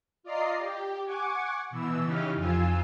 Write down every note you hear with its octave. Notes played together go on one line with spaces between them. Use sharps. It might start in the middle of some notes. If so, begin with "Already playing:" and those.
F4 D5 D#5 A#5 C7
G4
F#5 G#5 C#6 D6
B2 E3 E6
C#3 E3 C#4 D#4 G4 F6
F2 F4 G#5 E6